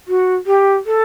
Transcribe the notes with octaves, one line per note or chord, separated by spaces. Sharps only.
F#4
G4
A4